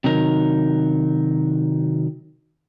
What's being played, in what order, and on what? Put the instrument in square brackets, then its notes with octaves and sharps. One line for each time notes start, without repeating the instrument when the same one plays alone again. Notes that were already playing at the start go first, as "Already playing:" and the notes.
[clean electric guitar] C3 D#3 F#3 D#4 A#4